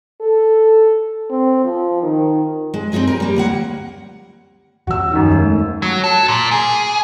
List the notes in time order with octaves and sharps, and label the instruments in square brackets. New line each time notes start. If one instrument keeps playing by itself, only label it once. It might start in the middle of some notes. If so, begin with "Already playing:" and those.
[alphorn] A4
C4
F3
D#3
[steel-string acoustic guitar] G#3
C4 D#4 F#4 G#4 D#5
A#4
G3 A#3
D2 A#3 F#5
[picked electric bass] E2 F3 C#4 [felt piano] F#4 E6
[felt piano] F#2 D#3
G#1
[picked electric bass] A3
[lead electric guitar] F#3
A4
A#2
G#4